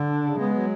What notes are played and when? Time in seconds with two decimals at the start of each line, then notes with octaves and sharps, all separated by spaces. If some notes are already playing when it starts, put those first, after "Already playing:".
Already playing: D3
0.09 D4
0.25 C#3
0.39 G#3 B3
0.54 F#3